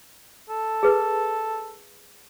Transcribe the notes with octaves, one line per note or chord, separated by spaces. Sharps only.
A4
G#4 B4